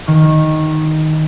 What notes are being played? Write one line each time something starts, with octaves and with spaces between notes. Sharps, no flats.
D#3